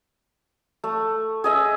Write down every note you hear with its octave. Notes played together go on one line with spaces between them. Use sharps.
A3
G#4 D#5 E5